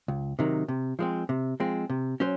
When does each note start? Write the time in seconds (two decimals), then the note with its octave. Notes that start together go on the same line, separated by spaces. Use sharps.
0.08 C#2
0.39 C3 D#3 F#3
0.68 C3
0.99 F3 G#3 C4
1.29 C3
1.60 F3 G#3 C4
1.90 C3
2.20 F#3 C#4 C5